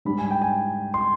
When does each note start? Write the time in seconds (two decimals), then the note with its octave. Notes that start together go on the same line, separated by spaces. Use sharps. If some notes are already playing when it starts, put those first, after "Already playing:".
0.05 G#2 G3 D4 B5
0.18 G#5
0.31 G5
0.42 G#5
0.94 C6